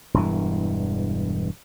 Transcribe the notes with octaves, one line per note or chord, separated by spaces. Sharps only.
E1 G2 E3